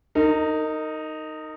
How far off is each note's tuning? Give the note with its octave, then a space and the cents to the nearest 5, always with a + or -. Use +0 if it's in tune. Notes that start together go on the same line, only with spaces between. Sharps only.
D#4 +0 A#4 -30